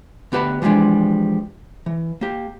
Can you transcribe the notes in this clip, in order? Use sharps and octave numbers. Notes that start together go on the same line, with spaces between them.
D2 B3 G4 B4 A5 B5
E3 F3 G3 G#3 D4
E3
A#3 G4